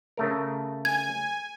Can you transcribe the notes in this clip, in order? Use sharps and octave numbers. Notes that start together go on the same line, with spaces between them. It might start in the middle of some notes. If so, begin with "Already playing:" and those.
C#3 A3 A#4
G#5 G#6